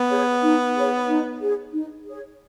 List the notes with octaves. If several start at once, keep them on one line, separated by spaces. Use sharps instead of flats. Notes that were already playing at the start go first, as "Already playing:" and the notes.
Already playing: B3
G#4 C#5
D#4
G#4 C#5
D#4
G#4 C#5
D#4
G#4 C#5